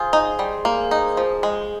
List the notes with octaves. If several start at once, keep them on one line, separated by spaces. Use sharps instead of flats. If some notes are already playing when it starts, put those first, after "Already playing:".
Already playing: F4 G#4 C5
D#4
G3
A#3
D#4
F3
G#3